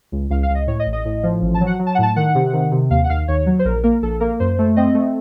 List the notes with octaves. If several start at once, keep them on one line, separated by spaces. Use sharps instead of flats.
C#2
C#2 F5
F5
C#2
D#5
A2 C#5
D#5
A1
D#5
A2
F3
A1
A5
F#3
F#5
F#3
A5
F#5
A2 A5
D#3 F#5
C3
D#3
C3
D#2 F5
F#5
D#2 F5
D#2 C#5
F#3
C5
A#1 A#4
A#3 A#4
A#1 A4
A#3 A#4
F#2 C5
A3
C4 D#5
A3